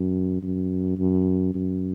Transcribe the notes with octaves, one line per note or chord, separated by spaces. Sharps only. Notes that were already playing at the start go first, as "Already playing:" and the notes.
Already playing: F#2
F#2
F#2
F#2